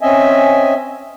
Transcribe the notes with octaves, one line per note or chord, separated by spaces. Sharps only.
C4 C#4 D#5 E5 G#5